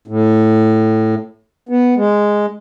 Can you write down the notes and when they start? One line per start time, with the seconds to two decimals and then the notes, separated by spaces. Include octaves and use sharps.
0.08 A2
1.69 B3
1.97 G#3